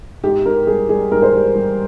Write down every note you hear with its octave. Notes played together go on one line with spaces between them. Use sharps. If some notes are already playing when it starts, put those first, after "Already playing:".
G#2 G4
G#2 A#4
G3 G#4
G3 G#4
G#2 A#4
C5
G3
G3